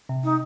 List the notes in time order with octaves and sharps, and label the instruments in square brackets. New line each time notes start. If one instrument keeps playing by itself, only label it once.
[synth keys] C3
[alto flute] D#4